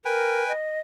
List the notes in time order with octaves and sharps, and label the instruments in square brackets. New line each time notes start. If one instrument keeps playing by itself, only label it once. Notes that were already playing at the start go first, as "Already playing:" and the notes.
[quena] A#4 [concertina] B4 G5 G#5
[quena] D#5